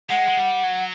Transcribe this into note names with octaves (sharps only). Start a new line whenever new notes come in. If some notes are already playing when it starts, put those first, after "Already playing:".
G#3 F#5
G#3
G3
F#3